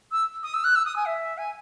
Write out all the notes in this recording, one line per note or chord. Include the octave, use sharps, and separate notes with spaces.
E6
D#6
E6
F#6
E6
D#6
G#5
E5
G#5